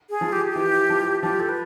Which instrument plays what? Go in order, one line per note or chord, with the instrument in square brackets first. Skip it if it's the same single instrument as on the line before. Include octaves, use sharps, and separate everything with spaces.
[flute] G#4
[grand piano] F3
[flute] G4
G4
[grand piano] E3
F3
[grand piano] F3 [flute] G4
[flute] A4
B4